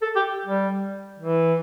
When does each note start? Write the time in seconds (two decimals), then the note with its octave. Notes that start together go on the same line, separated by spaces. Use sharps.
0.02 A4
0.16 G4
0.46 G3
1.19 E3